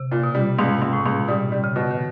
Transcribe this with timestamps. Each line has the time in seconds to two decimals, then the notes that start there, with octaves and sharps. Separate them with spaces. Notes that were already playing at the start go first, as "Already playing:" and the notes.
Already playing: C3
0.11 A#2
0.23 B2
0.35 G3
0.59 C#2 G#2
0.82 C#2
0.93 A2
1.06 C#2
1.28 B2 G3
1.52 G3
1.64 C#3
1.76 B2
1.91 D#3